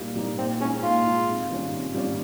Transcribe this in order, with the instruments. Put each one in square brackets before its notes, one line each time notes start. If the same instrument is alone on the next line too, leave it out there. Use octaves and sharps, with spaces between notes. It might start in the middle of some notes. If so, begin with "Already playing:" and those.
Already playing: [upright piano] A#2 G3 A#3 D#4
G3 A#3 D#4
[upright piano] A#2 [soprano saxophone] C4
[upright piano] G#3 [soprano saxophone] C#4
[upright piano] D#4
[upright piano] A#2 [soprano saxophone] F4
[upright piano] G#3 D#4
C3
D#3 G3 C#4 F4
C3
D#3 G3 C#4 F4